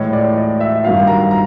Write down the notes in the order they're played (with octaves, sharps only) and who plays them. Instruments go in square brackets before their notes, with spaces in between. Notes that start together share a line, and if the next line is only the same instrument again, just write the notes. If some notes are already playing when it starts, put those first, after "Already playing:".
Already playing: [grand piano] A2 E3 G#3 C#5
D5
D#5
E5
G2 D#3 F#3 F5
A#5
A#5